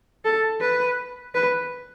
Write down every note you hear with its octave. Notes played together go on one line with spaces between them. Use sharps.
A4
B4
B4